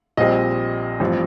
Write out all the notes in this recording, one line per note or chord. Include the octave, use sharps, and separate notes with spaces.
A#1 A#2 G3 C4 D#5
A1 G2 F3 C4